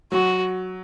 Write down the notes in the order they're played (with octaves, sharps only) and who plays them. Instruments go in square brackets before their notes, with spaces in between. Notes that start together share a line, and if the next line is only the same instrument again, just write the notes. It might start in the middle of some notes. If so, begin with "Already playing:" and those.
[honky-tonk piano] F#3 [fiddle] F#4